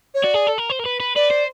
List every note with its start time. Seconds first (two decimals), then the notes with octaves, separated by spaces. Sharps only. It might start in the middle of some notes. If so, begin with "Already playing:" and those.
0.14 C#5
0.24 F#4 D5
0.34 G#4
0.47 A4
0.58 A#4
0.70 C5
0.79 A#4
0.85 B4
1.00 B4
1.16 B4 D5
1.30 C5